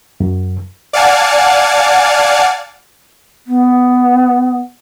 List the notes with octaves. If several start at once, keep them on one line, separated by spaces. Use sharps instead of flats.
F#2
D5 F5 F#5 G#5 A5
B3